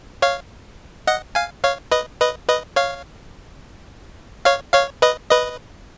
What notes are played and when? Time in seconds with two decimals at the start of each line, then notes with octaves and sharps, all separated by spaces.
0.22 C#5 F5
1.07 D#5 F#5
1.35 F5 G#5
1.63 C#5 F5
1.92 B4 D#5
2.21 B4 D#5
2.48 B4 D#5
2.76 C#5 F5
4.45 C#5 F5
4.73 C#5 F5
5.02 B4 D#5
5.30 B4 D#5